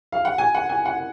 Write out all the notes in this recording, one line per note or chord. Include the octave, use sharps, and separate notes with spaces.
F5
F#5
G#5
F#5
G#5
F#5